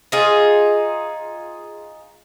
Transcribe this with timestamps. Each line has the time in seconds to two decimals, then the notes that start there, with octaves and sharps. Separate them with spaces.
0.12 D#4 F4 G#4